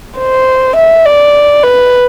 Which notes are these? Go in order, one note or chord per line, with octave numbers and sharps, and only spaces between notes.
C5
E5
D5
B4